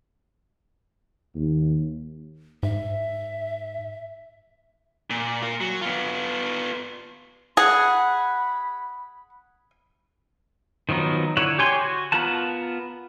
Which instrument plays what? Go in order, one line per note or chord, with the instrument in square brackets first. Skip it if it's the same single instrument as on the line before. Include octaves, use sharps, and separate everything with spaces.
[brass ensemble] D#2
[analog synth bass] G#2 [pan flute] E5
[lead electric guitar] A#2
F4 A#4
F#3
B3 F4
[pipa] G#4 [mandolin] F#5 [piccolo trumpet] B5
[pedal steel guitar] D#3 F3 F#3 B3 D#4
D3 E4 C#5 F#5
G4 C#5 G#5 C6
F#4
B3 F4 A#4 F#5 A5